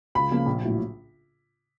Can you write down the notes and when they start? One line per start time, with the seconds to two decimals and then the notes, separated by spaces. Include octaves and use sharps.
0.15 C#2 B5
0.31 C#3 F3 A#3
0.46 A#1
0.62 A2 F#3